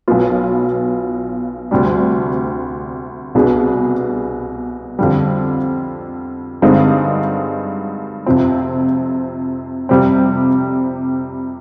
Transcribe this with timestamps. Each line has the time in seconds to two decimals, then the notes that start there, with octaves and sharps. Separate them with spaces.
0.08 B1 B2 B3 F4
1.71 D2 C3 G3 D4
3.35 C2 B2 B3 D4 G#4
4.99 F2 D3 G3
6.62 G2 D3 G#3 C4 D#4
8.26 F2 C3 F3 C4
9.89 F2 C3 G3 C4